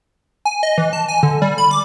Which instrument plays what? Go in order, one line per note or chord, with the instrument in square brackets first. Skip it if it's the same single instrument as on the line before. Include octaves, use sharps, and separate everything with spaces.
[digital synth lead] G#5
D#5
E3
A5
G#5
D3
G3
B5
D6